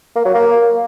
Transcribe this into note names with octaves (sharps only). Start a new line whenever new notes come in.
A#3
F#3
A#3